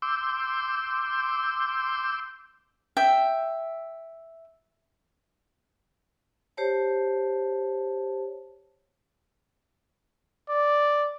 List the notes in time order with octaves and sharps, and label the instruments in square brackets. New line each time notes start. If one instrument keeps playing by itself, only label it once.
[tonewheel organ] C6 D6 E6 G6
[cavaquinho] E5 G5
[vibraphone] G4 C5 C#5 A5
[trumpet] D5